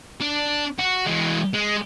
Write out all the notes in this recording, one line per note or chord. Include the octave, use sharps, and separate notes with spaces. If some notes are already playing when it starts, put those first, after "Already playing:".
D4
F#4
E3 G#3
G#3